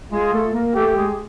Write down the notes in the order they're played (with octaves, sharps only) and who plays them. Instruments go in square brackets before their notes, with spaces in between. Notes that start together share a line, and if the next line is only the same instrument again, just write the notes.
[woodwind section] G#3 G#4 [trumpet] F4
[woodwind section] A3 A4
A#3 A#4
[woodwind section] A3 A4 [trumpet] G4
[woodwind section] G#3 G#4